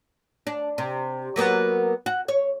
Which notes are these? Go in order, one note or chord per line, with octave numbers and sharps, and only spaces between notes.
D4
C3
F#3 A#3 B3
F#4
C#5